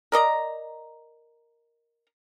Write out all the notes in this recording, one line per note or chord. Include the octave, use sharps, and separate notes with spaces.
A#4 D5 D#5 A#5